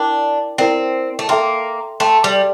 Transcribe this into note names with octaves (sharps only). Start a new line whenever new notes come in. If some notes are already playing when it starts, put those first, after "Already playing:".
Already playing: D4 E4 A#4 D5 G5
C4 E4 A#4 D5 G5
A3
A#3 A4 E5 G5 C6
A3 A4 E5 G5 C6
G3